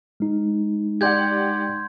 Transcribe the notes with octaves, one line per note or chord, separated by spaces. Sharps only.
G#3 D#4
G4 D5 F#5 C6 G6 G#6